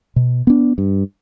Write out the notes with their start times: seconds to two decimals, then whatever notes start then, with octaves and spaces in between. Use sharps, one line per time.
0.16 B2
0.47 B3 D4
0.78 G2